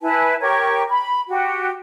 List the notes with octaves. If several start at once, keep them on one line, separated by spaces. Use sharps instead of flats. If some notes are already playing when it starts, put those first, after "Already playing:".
E4 B4 G#5 A5
G4 A#4 C#5 C#6
B5
F#4 G4